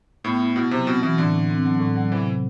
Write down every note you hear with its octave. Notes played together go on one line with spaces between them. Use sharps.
A2 B3
E4
B2 E4
C3 F#3
B2 C4
B2 E3
A2 D3
A2
C4
F#3
A2
F#3
C3 E3
C3